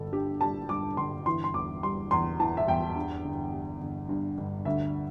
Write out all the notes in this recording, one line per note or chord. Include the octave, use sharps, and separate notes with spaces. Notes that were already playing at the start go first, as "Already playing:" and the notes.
Already playing: G1 G2 A4
D3 G4
G3 A5
G2 D6
G1 C6
E3 C6
C6
E2 D6
G3 C6
E2 C6
E3 A5
E5
E2 G5
G2
G1
G3
G1
G2
G1
D2 E5